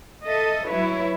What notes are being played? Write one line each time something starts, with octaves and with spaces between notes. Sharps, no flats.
A4 D#5 E5
F#3 E4 B4 C#5